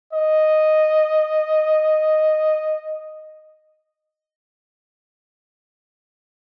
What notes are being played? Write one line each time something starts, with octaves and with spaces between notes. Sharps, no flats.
D#5